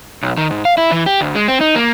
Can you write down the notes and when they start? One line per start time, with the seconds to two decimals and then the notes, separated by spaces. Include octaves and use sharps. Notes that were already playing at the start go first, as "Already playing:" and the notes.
0.22 B1
0.38 D#3
0.51 G#2
0.65 F5
0.77 E4
0.92 E3
1.06 G4
1.21 D2
1.35 G#3
1.48 C4
1.61 D#4
1.76 A#3